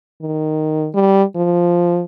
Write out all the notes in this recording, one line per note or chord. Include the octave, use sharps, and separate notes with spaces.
D#3
G3
F3